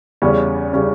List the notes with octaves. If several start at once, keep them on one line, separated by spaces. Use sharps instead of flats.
E2 C#3 G3 C#4
C#3 G3 C#4